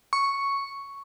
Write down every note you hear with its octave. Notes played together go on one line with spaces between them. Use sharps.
C#6